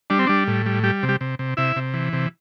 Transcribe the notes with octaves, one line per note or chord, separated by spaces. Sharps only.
G3 D4
C4
G3 D4
A2
G3
G3 G4
C3
G3 G4
C3
C3
C3 E4 E5
C3
E3
C3